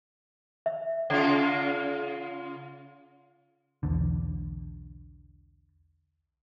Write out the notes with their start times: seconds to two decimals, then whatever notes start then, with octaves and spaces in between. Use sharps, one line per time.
0.66 E5
1.10 C#3 F4
3.83 B1 E2 D3